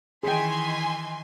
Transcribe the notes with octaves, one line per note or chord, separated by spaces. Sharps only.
D#3 E3 D#4 G#4 G5 G#5 C6